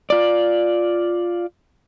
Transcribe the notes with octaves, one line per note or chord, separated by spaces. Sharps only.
F4 D5